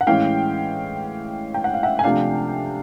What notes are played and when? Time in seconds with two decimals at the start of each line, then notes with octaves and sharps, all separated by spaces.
0.01 F#5
0.07 A2 E3 G#3 C#4 F5 G5
1.54 G5
1.64 F#5
1.74 F5
1.83 E5 F#5
1.99 G#5
2.04 C3 F3 A3 D4 F5 G5